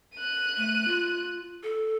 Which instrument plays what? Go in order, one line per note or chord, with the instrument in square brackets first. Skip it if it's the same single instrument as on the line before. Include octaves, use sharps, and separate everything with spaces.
[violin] F#6 D#7
[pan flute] A3
F4
A4